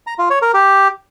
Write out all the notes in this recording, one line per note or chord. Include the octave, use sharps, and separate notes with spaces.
A#5
F4
C#5
A#4
G4